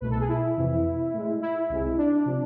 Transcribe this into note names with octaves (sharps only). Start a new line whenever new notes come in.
C2 B2 A3 B4
A4
G#4
E4
F2 C3 E3
A2 G#3
E4
C2 C3 G#3
D4
C3 F3